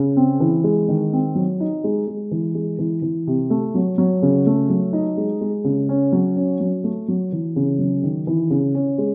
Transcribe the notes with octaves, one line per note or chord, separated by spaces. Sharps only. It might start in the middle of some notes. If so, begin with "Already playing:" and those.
Already playing: C#3
C4
E3
G#3
D#3
C4
F#3
D#4
G#3
G#3
E3
G#3
E3
E3
C3
A3
F#3
F#3
C#3
A3
F#3
D#4
G#3
G#3
C#3
C#4
F#3
C#4
F#3
A3
F#3
E3
C#3
F#3
D#3
E3
C#3
C#4
G#3